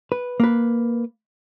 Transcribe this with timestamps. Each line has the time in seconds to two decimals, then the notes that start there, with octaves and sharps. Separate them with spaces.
0.12 B4
0.40 A#3 B4